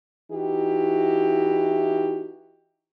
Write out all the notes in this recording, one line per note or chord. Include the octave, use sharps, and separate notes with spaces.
E3 D#4 E4 F#4 G4